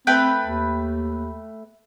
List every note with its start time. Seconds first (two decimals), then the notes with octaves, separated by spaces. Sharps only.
0.07 A3 C4 B4 G5
0.45 D#2